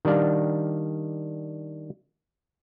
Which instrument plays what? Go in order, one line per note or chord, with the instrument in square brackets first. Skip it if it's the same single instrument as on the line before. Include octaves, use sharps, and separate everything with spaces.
[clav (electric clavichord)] D#3 G3 D4 D5 F5